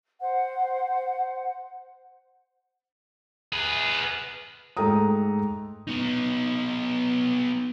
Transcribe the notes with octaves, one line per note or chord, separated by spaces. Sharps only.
C5 F#5
G#4 B4
G#2 A3 A4 G5 A#5 D#6
B3 D#4